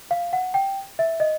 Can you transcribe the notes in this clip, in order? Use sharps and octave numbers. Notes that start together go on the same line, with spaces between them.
F5
F#5
G5
E5
D#5